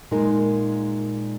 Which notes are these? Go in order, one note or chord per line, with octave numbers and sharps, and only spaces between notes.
A#2 G#3 D#4 A#4